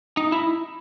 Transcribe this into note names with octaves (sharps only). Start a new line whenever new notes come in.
D#4
E4